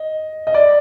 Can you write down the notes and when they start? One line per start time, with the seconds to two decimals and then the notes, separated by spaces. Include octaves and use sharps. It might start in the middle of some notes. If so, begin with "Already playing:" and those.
Already playing: D#5
0.47 D#5
0.54 D5